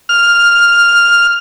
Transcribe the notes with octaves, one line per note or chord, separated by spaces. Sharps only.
F6